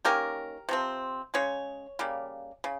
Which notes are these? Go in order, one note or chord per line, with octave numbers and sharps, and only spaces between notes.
D#3 A#3 C#4 G4 A#4
C3 F3 C4
C#3 G#3 C#4 C#5
C#3 G3 A#3
C#3